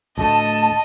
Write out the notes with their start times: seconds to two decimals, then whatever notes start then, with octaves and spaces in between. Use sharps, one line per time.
0.18 D2 A2 A3 D#5 A5